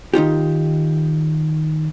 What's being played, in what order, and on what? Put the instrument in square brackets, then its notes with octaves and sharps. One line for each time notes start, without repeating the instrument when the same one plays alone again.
[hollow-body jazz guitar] D#3 D#4 F4 G4